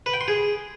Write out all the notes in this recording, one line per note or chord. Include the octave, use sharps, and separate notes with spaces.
B4
G5
C6
G#4